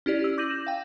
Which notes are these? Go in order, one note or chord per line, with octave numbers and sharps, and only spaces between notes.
C#4 E4 G4 D5
E6
D6 G6 A#6 D#7 F#7
E7
F5 G5